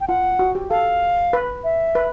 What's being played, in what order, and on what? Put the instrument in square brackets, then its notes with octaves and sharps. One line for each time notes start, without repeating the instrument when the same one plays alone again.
[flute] G5
[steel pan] F4 [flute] F#5
[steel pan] F#4
G4
[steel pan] A4 [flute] F5
[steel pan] B4
[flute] E5
[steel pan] B4